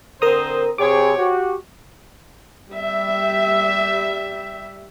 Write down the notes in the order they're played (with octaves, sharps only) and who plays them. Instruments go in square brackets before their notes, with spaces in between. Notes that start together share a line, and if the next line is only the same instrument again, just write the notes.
[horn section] D3 C4 C5 [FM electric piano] A#4 A#5 D#6
[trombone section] C3 G#4 [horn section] C5 C#5 [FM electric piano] D6
[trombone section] F#4 G4
[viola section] G3 E5